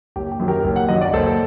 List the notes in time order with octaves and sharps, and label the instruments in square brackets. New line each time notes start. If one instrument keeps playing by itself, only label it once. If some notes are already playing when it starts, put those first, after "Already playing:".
[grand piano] F#1 G4
G4
F#2 D#3 F#3
G4 A#4
F#1
F#5
F#2 D#3 F#3 D#5
D5
F#1 A4 C5